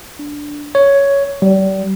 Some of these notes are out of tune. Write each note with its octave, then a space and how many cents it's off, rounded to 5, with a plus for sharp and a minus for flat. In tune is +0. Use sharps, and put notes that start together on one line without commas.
D4 +0
C#5 +5
G3 -35